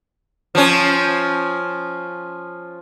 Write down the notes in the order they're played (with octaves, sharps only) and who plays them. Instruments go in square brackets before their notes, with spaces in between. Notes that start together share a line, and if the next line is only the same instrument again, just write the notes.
[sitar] F3 C#4